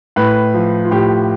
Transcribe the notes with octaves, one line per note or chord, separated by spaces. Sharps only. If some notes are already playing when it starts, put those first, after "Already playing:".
A2 B4
F3
F4
A2 G4